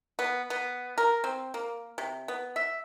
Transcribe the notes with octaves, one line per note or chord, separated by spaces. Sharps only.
B3
B3
A#4
C4
A#3
C3
B3
E5